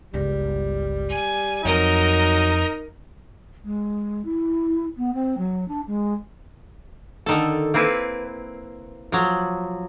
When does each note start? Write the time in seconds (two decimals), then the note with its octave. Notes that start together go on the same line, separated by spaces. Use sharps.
0.14 G1 C#2 G3
1.09 G#5
1.65 F2 F#3 A3 D#4 A#4 D#5
3.64 G#3
4.25 E4
4.97 B3
5.13 C4
5.37 F#3
5.68 D4
5.87 G#3
7.26 D3 D#3 A4
7.74 A#3 C4 E4 B4
9.12 F3 F#3